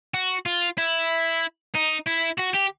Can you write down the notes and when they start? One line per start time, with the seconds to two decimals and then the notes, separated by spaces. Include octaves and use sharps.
0.14 F#4
0.46 F4
0.78 E4
1.75 D#4
2.06 E4
2.38 F#4
2.54 G4